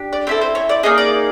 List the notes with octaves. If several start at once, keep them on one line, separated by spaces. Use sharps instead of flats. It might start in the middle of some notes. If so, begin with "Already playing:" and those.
Already playing: D4 G4
D5
C4 E4 A4 C#5
C5
C#5
D5
A#3 D#4 G#4 D#5
D5